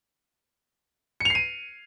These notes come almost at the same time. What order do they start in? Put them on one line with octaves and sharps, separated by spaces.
C#7 F7 C7 D#7